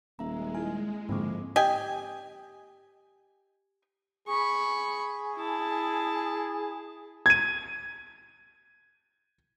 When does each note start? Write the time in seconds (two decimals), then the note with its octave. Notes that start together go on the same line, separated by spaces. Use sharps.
0.19 D#1 G#3 E5 A#5
0.55 E4 G#5
1.09 F2 G#2 D3 A#3 D6
1.56 G4 D#5 G#5
4.28 G#4 B5 C#6
5.36 E4 A5
7.26 G#6 D#7